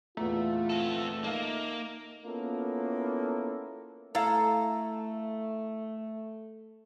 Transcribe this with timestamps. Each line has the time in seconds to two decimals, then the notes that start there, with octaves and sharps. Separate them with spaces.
0.17 E2 A#2 A3 F4 A#5
0.70 C4 A4
1.24 A#3 D#4 E5 F5
2.25 A#3 B3 C#4 E4 F4 A4
4.15 A3 E4 A4 F5 A#5